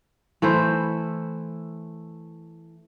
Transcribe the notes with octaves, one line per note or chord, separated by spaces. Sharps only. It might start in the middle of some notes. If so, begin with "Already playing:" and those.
E3 A3 E4 C5